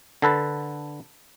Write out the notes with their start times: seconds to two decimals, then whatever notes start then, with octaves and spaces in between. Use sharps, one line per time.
0.22 D3 A4 B4 A5